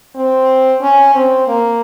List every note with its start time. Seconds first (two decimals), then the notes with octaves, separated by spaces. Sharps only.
0.16 C4
0.82 C#4
1.14 C4
1.48 A#3